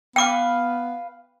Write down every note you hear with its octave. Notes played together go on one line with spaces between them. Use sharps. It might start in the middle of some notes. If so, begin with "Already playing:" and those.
B3 B4 F5 G5 D6